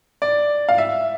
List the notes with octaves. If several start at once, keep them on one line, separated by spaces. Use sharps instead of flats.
D5
F5
E5